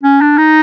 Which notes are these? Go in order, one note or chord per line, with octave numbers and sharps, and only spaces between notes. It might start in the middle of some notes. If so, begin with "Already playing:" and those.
C#4
D4
D#4